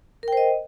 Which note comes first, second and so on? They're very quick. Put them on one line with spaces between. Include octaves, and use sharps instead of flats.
A#4 G5 C5 D#5